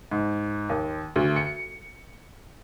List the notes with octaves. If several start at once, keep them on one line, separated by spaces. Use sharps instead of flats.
G#2
D#2
D2
C#7